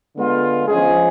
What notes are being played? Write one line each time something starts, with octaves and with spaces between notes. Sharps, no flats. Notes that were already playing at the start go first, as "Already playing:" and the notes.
D3 G#3 B3 F4
F3 G#3 C#4 G#4